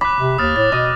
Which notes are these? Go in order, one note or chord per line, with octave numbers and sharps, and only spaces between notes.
B5 D6 F#6
C3
D#2 D#6 F6 A6
A2 A6
B2 D#5